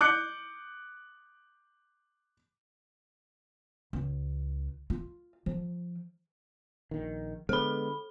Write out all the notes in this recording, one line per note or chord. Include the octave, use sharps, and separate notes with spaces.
D6 F#6 G6 C#7
C#2
F4
F3
A#1 D#3
D3 G#3 B3 A4 B5